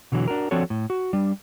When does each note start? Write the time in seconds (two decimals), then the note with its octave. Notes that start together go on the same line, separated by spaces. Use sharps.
0.12 B2 D3 E3 F#3
0.28 D4 F#4 A#4
0.51 F3 C4 D4 F#4 A4 C#5
0.70 A2
0.90 F#4
1.13 G3 D4